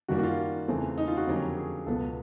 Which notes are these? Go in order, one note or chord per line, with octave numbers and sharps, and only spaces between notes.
F#2 D#3 G3 A#3 F#4
F#4
F4
E2 C#3 E3 A3 C4
D#4
F4
F#4
F2 D3 F#3 A#3 C#4 G4
G#4
C#2 B2 F#3 B3 A4